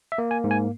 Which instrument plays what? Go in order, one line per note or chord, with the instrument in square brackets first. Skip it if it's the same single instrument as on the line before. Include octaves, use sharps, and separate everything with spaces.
[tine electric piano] E5
A#3
G#5
G#2
G#5